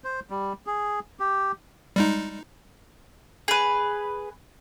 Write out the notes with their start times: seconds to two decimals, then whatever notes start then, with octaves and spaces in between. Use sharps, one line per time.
0.04 C5
0.30 G3
0.67 G#4
1.20 G4
1.96 G3 G#3 D#4
3.48 G#4 B4